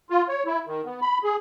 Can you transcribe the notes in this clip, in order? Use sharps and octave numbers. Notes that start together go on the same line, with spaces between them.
F4
C#5
E4
D#3
B3
B5
G#4